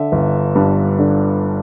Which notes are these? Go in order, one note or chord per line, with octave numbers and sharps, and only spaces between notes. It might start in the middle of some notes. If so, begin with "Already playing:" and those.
Already playing: D3 E5
G1
G2
D3